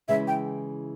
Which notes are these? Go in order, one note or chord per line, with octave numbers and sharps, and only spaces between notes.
C#3 E3 G#3 E4 E5
G5